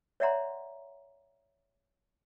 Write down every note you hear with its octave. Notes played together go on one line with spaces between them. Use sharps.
C#5 D5 E5 F#5 A#5 C6